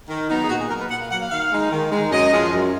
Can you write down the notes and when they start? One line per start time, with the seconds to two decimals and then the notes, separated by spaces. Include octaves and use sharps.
0.09 D#3
0.30 F#3 B3 D#4
0.44 G#4
0.49 A#2 F#4
0.60 G#4
0.70 F#3 A#3 A#4
0.80 B4
0.90 A#2 F#5
1.00 F5
1.11 F#3 A#3 F#5
1.21 F5
1.31 D#3 F5
1.52 G#3 D#4
1.72 D#3
1.92 G#3 D#4
2.12 F#2 D#5
2.32 F3 G#3 C#4 F4
2.53 F#2